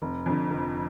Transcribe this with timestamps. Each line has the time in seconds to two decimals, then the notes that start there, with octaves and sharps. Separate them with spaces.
0.02 F1
0.26 F2 D3
0.50 F1